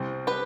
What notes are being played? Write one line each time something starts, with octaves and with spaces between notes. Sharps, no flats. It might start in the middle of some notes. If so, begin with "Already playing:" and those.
Already playing: C2 C3 G3 C4
G4 B4